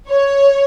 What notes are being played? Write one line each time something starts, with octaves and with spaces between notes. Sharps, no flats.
C#5